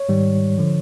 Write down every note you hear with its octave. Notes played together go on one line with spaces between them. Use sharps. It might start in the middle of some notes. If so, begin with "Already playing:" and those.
Already playing: C#5
G#2 D#3 G3
D3 F3